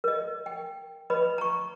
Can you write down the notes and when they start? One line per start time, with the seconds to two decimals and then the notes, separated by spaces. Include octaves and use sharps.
0.04 A#4 D#5
0.46 G5
1.10 B4 D#5 B5
1.38 A#5 C#6